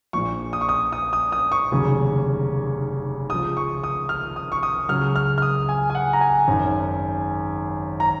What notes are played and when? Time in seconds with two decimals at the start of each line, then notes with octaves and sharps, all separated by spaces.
0.13 A#1 A#2 F3 C#6
0.53 D#6
0.61 C#6
0.69 D#6
0.92 D#6
1.13 D#6
1.32 D#6
1.52 C#6
1.72 F1 D#2 C#3 F#3
3.30 C#2 C#3 F3 D#6
3.57 C#6
3.84 D#6
4.09 F6
4.36 D#6
4.52 C#6
4.63 D#6
4.89 C#2 C#3 F#3 F6
5.16 F6
5.38 F6
5.42 D#6
5.69 G#5
5.90 G#5
5.95 F#5
6.13 A#5
6.21 G#5
6.48 G#1 F#2 D#3
8.00 A#5